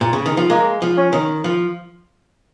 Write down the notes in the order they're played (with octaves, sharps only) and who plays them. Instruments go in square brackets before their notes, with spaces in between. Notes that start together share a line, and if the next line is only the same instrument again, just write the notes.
[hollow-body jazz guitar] A#2
C#3
D#3
F3
[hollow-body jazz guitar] G#3 [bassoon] A#3
[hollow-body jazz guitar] F3
[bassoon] C#4
[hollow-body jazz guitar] D#3
F3